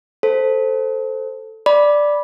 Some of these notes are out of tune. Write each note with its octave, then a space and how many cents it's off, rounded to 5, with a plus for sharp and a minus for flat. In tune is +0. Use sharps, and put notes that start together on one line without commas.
A4 +5 C5 +0
D5 +0 B5 -10